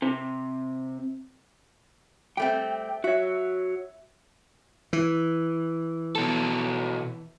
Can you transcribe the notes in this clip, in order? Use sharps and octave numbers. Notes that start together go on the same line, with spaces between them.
C3
G3 A3 C4 G5
F#4 C#5 E5
E3
B2 A4